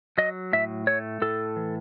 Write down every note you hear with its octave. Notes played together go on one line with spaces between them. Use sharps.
F#3 D#5
A2 E5
A3 C#5
A2 A4
E3